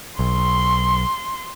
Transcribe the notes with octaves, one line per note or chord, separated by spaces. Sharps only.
B1 C6